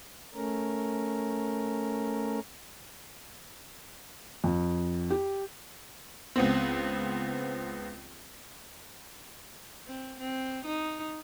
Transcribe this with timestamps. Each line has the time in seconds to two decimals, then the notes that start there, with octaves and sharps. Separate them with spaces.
0.34 A3 C#4 A#4
4.44 F2
5.10 G4
6.36 C#2 B3 C4
9.88 C4
10.20 C4
10.65 D#4